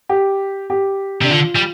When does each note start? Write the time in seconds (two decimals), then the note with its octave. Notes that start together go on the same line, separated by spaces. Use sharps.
0.09 G4
0.70 G4
1.22 C3 D4
1.30 D3 F4
1.56 G3